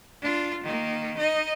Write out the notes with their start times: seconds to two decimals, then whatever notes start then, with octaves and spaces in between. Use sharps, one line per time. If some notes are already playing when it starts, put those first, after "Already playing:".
0.21 D4 F4
0.63 D#3 A#3
1.17 D#4 D#5